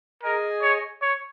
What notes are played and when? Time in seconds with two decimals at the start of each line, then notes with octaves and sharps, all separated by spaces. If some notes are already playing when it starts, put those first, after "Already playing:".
0.23 G#4 A#4 D#5 G#5
0.62 C#5
1.02 C#5